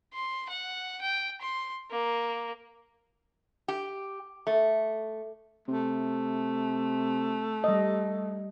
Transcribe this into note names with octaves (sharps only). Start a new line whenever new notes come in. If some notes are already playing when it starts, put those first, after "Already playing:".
C6
F#5
G5
C6
A#3
G4
A3
C3 A3
G3 D#5